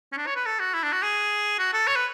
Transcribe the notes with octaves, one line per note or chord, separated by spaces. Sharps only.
C#4
D4
C#5
B4
A4
F#4
E4
D4
F#4
G#4
F#4
A4
C#5
B4